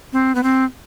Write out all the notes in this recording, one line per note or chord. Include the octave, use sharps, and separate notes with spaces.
C4
B3
C4